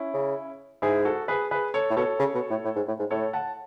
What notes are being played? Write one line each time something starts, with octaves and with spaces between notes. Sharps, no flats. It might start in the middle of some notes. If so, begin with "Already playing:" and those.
Already playing: C#4 E4
C#3
G#2 E4 G#4
F#4 A4
G#4 B4
G#4 B4
A4 C#5
A2
B2 A4 C#5
C#3
B2
A2
A2
G#2
A2
G#2
A2 A4 C#5
F#5 A5